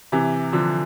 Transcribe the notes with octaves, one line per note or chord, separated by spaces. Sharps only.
C3 E3
D3 F3